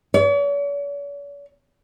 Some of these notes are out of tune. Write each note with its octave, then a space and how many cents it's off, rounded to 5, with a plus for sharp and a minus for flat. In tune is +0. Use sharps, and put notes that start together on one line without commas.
C#5 +45